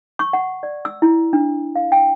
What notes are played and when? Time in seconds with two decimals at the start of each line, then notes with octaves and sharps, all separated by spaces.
0.19 C#6
0.33 F#5
0.63 D5
0.85 E6
1.02 E4
1.33 D4
1.76 F5
1.92 G5